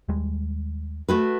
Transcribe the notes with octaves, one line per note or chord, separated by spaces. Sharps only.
D#2 G3 G#3
A3 F#4 B4